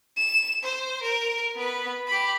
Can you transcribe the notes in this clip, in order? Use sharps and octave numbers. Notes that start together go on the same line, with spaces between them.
E7
C5
A#4
B3 B4
G4 B5